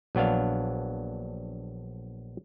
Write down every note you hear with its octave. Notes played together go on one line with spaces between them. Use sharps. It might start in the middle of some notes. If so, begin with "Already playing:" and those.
A#1 F#3 B3 D4 F5